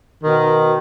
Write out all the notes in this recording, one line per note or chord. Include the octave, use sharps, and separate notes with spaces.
B2 D#3